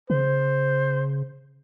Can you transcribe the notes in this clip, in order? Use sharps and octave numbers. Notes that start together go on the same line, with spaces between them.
C#3 C5